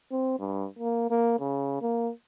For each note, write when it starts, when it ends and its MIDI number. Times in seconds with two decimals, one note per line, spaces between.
0.12 0.36 60
0.40 0.67 43
0.79 1.09 58
1.10 1.35 58
1.40 1.78 49
1.82 2.11 58